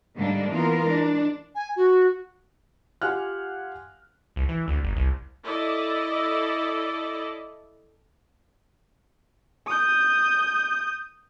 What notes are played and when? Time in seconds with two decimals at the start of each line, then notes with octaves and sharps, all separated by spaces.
0.16 G#2 D3 G3 A#3 D4
0.49 E3 A#3 B3 F4 A#4
0.85 G#3 D4
1.55 G#5
1.76 F#4
3.02 F4 G4 F#5 G#5 F6 F#6
4.36 C2
4.49 E3
4.68 D2
4.83 G1
4.96 C2
5.45 E4 A4 D5 D#5
9.67 D#6 G6